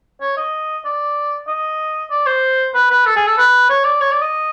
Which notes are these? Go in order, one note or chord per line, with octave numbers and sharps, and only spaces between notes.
C#5
D#5
D5
D#5
D5
C5
B4
B4
A4
G#4
A4
B4
C#5
D5
C#5
D5
D#5